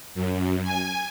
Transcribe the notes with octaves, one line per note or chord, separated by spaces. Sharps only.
F#2
G#5